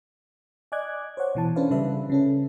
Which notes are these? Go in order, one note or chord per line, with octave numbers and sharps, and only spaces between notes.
D5 D#5 G#5 D6 F#6 G#6
C5 C#5 F#5
B2 E3 A5
C#4 D4 A4 B4 C5 F5
C#3 G3 B4 E5
C#3 C#4 A4